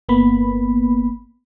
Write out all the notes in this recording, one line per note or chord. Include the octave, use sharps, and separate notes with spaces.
G1 A#3 B3 B5